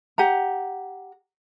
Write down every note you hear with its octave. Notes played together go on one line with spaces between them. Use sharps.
G4 F#5 A#5